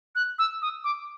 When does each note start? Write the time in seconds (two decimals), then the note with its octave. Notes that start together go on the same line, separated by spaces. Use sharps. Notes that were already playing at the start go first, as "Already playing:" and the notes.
0.15 F#6
0.39 E6
0.62 D#6
0.84 D6